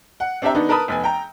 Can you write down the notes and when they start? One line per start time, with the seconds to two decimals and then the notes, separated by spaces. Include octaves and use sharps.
0.20 F#5
0.42 C4 D4 G4 C5 E5 A#5
0.54 D#3 B3 D4 D#4
0.69 A#4 B4 A5 B5 D#6
0.88 F1 B3 G#5
1.04 G5 A#5